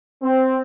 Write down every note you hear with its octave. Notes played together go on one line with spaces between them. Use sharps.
C4